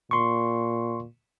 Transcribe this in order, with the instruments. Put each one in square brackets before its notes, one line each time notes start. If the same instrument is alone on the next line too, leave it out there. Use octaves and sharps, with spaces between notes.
[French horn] A#2 [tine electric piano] C6 C#6